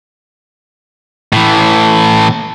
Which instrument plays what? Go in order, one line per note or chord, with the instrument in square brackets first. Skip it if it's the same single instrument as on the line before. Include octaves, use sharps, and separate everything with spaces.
[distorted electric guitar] A2 E3